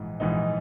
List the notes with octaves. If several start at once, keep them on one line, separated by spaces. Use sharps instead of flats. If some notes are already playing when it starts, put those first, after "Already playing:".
Already playing: A#1 G#2 E3
A#1 G#2 E3 D#4